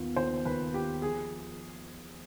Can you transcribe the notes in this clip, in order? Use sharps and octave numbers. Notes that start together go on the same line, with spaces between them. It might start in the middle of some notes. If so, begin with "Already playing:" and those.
Already playing: D#2 B3 F4
D#3 C5
D#2 B4
F4 G4
F3 G#4